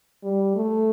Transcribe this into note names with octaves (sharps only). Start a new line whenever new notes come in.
G3
A3